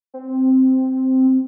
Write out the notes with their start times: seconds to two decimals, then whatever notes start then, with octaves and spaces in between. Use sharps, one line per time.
0.14 C4